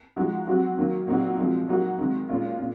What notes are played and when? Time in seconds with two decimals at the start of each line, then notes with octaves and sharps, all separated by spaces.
0.16 F3 G#3 D#4 F#4
0.47 F#3 C4 F#4
0.77 D#3 F#3 A#3
1.07 A#2 F#3 C4 D#4 F#4
1.38 C3 F3 G#3
1.68 F#3 A#3 D#4 F#4
1.98 C3 D#3 G#3
2.29 A#2 G#3 C#4 F4
2.59 A#2